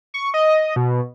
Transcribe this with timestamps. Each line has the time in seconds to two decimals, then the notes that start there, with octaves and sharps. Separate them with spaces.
0.14 C#6
0.34 D#5
0.76 B2